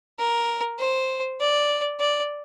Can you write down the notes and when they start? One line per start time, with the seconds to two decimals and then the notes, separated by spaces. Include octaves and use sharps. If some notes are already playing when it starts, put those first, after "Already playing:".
0.19 A#4
0.79 C5
1.40 D5
2.00 D5